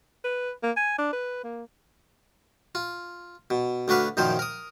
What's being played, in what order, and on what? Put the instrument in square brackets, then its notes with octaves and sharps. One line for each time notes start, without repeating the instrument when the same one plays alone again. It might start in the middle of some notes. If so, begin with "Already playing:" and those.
[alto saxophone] B4
A#3
G#5
D4
B4
A#3
[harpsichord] F4
B2
D2 D4 F#4 B4 F5
F#2 A#2 D#3 F3 C5
A#4 D#6